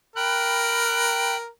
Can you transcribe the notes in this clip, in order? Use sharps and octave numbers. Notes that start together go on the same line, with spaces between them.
A#4 G5 B5 F#6